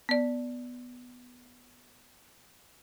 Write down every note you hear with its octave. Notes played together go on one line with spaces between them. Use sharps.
B3 D5